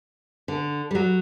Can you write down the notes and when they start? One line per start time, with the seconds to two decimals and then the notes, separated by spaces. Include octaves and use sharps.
0.48 D3
0.91 G3
0.95 F#3